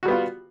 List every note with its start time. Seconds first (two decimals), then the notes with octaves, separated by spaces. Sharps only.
0.03 F#4
0.05 G3
0.08 B3
0.11 F4